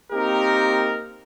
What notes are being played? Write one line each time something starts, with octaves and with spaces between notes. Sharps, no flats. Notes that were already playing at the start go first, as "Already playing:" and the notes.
A#3 C4 D#4 G4 A#4